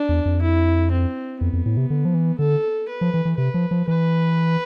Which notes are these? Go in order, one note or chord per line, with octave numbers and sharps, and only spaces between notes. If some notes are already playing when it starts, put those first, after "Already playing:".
Already playing: D4
E2
F2
E4
C4
F2 B3
F2
A2
C3
D3
F3
E3
D3 A4
B4
F3
E3
E3
C3 B4
F3
F3
E3 B4